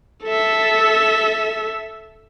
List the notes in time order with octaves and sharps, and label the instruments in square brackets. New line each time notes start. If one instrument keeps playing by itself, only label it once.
[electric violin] A4 E5